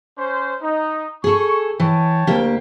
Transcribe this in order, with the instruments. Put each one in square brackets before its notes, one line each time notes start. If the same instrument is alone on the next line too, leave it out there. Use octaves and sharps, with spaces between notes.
[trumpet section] C#4 C5
D#4
[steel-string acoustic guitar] G#4 A4 [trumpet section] C#6
[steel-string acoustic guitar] E3 [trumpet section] C#5 G5 A5
[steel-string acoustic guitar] D2 A#3 G4